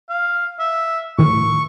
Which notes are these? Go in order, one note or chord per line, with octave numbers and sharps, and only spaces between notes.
F5
E5
A2 D#3 C#6